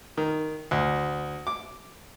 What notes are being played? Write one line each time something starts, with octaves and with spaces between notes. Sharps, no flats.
D#3
D2
D6